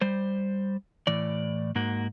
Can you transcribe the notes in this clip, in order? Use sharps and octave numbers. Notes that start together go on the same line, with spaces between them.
G3 C5
A2 E3 D5
G#2 A#3 F#4